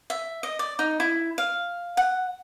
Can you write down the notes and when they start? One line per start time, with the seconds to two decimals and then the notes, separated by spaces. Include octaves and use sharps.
0.10 E5
0.43 D#5
0.59 D5
0.79 D#4
1.00 E4
1.38 F5
1.97 F#5